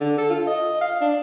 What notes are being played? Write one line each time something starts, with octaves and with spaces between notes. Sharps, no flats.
D3
A4
F4
D#5
F5
D4